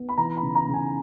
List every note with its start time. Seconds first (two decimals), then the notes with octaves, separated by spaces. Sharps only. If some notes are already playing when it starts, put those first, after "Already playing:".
Already playing: B3
0.09 B5
0.18 E3 A#5
0.37 B5
0.42 C#3
0.55 A#5
0.68 C#3
0.73 G#5